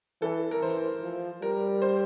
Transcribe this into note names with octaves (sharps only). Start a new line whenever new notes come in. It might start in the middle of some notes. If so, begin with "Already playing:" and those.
E3 A4
A#4
E3 C5
F3
G3 A#4
C5